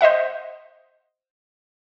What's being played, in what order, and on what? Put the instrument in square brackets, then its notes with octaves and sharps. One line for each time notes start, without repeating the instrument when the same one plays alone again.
[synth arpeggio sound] C5 D#5 E5 F#5